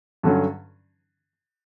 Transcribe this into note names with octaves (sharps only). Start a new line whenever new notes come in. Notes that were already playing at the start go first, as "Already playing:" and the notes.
G2 D3 F#3 C#4